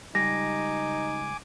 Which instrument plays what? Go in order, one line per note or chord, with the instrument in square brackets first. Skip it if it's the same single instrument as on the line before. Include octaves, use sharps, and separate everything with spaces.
[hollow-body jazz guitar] C#2 G3 [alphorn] D#4 [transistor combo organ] G#5 D6 [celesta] A#6